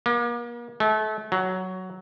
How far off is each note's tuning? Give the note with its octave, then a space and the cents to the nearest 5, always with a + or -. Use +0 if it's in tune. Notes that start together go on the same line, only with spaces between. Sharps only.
A#3 +40
A3 -30
F#3 +10